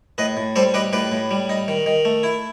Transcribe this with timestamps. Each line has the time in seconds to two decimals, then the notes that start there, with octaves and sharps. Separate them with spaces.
0.18 A2 B4 D#5
0.37 A2
0.56 G3 A4 C5
0.74 D#4 G4 B4
0.93 A2 G4 B4
1.12 A2
1.31 G3
1.49 D#4
1.68 D#3
1.86 D#3
2.05 A3
2.23 E4